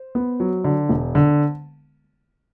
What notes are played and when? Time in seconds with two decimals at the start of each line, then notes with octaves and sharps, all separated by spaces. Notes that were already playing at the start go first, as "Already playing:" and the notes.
Already playing: C5
0.15 B3
0.40 F#3
0.64 D3
0.89 E1
1.15 D3